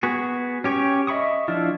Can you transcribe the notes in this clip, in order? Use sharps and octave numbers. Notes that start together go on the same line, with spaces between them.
B3 F#4 G#4
C#4 G4 C#5 G5 C#6
D#5 E5 B5 C#6 D#6
F3 D4 E4 F4